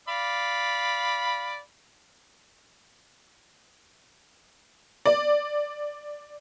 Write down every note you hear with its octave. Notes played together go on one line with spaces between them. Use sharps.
D5 F5 B5
D5